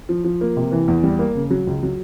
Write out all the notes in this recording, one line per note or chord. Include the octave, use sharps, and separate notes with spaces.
F3
F3
A#3
C3
E3
E2
G3
A#3
C#3
F#3
C#2
F#3